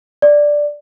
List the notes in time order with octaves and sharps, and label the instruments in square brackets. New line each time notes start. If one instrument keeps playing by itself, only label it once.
[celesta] D5